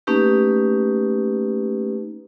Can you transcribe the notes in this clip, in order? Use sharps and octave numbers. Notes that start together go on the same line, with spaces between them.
A3 A#3 C#4 D#4 G4 B4